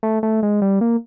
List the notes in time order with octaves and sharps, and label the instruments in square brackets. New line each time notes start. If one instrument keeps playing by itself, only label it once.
[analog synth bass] A3
A3
G#3
G3
A#3